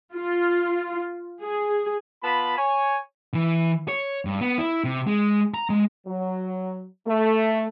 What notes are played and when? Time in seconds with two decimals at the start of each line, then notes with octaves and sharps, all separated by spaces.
0.14 F4
1.41 G#4
2.24 B3 F4 A5 B5
2.58 C#5 G#5
3.34 E3
3.88 C#5
4.25 G2
4.41 B3
4.58 E4
4.84 C3
5.07 G#3
5.54 A#5
5.70 G#3
6.07 F#3
7.07 A3